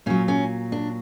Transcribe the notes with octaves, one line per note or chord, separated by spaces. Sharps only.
A#2 F#3 C#4
C#4
D4